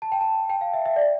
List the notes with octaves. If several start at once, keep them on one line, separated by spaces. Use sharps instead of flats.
A5
G5
A5
G5
F5
E5
E5
D5